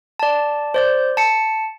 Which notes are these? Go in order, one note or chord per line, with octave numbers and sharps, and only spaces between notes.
D5 A5
C5 D5 G6
A5 C#7